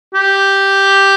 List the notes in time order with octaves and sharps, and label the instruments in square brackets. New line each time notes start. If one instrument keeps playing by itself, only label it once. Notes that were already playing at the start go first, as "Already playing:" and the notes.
[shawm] G4